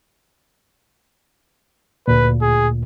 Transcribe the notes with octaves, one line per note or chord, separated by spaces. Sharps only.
D2 A#2 B4
G#4